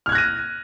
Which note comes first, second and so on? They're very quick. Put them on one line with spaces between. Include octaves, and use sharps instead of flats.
F6 G#6 F#6 A#6 D#7